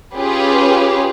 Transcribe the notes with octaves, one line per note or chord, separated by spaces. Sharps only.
C#4 F4 G4 G#4 B4